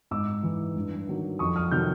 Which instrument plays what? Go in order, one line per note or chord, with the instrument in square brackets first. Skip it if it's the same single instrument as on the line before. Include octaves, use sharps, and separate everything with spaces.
[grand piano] G#2 D6 E6
E3
G2
D#3 F#3
F2 C#6 D#6
D#6 F6
C3 D#3 F#3 F6 G6